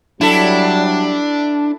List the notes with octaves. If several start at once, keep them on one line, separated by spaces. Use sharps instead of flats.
F#3 G3 D4 E4 A4